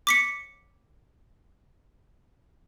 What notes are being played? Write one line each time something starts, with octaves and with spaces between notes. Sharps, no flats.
D6 B6 C#7